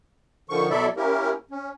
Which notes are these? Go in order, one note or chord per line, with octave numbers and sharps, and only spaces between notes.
D3 D#3 F3 C#6
B2 F#3 E4 A4 D5 E5
A#3 C#4 E4 G4 A#4
C#4